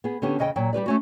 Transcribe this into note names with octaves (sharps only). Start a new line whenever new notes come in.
B3 G#4
D3 B3 C#4 G4
E2 C#3 D#5 F#5 G5
A#2 F#3 G5
G3 G4 B4 D5
A3 C#4 F#4